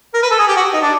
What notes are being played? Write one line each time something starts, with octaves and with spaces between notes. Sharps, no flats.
A#4
B4
A4
G#4
G4
F#4
D#4
D4